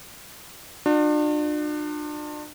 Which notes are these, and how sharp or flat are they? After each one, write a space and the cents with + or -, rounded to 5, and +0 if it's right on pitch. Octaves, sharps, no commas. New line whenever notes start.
D4 +35 F4 +45